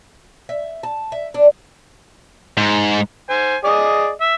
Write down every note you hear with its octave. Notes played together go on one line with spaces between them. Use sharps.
E5
A5
E5
D4
G#2
C5 G#5
G#4 D5 D#5
E5